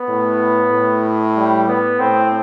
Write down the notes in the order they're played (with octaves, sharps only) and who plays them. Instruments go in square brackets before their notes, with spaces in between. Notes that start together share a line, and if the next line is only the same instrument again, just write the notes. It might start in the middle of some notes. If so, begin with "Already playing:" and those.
Already playing: [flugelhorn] B3
[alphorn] A2
A2
[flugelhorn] G3
B3
[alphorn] A2 [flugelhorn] C4